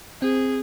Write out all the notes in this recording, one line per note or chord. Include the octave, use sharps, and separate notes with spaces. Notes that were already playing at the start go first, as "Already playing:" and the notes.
C4 G#4